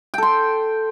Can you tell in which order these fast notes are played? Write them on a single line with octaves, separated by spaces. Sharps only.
G5 A4 C6